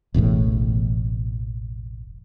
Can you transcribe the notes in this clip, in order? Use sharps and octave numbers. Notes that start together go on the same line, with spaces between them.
E1 A1 E2 A2